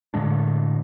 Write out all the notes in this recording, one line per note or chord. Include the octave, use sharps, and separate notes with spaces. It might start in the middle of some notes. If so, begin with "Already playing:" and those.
A2 D3 G#3 D4